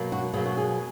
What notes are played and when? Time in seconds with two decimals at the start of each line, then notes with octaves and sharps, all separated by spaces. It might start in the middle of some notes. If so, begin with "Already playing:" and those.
Already playing: B2 F#3 A#3
0.12 F#4
0.33 B2 F#3 A#3 G#4
0.45 F#4
0.57 G#4